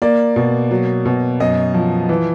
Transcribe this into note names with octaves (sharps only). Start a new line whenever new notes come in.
A#3 D5
B2
F#3
B2
F#2 D#5
F3
E3